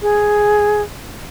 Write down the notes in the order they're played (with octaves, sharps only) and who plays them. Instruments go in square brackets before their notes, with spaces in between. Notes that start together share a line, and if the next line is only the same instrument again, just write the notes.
[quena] G#4